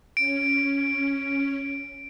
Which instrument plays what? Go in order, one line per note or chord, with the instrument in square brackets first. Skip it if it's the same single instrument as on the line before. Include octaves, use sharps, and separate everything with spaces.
[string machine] C#4 [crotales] D7